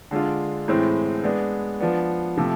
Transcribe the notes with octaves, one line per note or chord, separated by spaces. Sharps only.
D3 G#3 D4 F4
A2 E3 G#3 C4
G#3 B3 D4
F3 B3 D4
C3 F3 A3